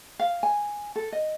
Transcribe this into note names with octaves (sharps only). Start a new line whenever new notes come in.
F5
G#5
A4
D#5